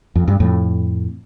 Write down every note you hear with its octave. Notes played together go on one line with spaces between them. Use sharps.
F2
G2
F2 A2